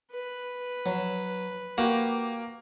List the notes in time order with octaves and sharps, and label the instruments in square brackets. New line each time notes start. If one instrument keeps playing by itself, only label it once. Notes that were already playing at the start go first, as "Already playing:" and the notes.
[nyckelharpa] B4
[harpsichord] F#3
[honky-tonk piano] A#3 [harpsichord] F#4 G4